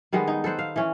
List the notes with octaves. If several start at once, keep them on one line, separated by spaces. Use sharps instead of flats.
D#3 G3 G#3 B3
D#4
A4 B4 C5 F#5
F5
E3 C#4